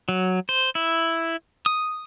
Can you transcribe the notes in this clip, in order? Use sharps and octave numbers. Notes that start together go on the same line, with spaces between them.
F#3
C5
E4
D#6